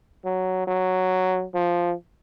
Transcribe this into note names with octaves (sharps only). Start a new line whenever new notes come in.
F#3
F#3
F3